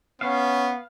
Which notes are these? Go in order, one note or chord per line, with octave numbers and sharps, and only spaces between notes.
B3 C#4 F5